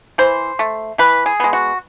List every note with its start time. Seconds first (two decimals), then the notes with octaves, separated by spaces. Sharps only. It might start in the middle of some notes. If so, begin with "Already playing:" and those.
0.18 E3 C5
0.59 A3
0.98 E3 B4
1.26 G#4
1.40 G#3 B3
1.53 F#4